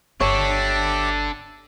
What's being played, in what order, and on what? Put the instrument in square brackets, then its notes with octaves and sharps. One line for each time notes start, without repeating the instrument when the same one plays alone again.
[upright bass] G1 [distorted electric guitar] D4 A4 [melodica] G4 E5 D6 [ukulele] C#5